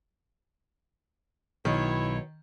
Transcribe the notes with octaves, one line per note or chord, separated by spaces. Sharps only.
B1 B2 D#3 E4 C#5